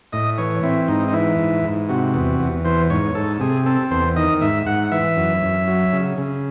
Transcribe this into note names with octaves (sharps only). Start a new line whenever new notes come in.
A2 D#5
E3 C#5
C4 E4
G#2 D#4
D#4
E3 E4
G#2
G#2
C3 F#4
E2
E2
E3 C5
G#2 C#5
G#2 A4
C3 G#4
C4 A4
E2 C5
D#3 D#5
G#2 E5
G#2 F#5
E3 E5
F#2
F#2
F#3
C#3
C#3